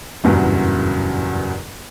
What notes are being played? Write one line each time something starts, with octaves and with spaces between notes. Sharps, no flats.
F#1 E2 G2 A#2 C#3 F#3